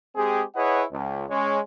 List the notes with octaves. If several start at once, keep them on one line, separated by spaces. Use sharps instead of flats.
G#3 C4 G4 G#4
E4 G#4 B4 C#5 D#5 F#5
C#2
G#3 C#4 C#5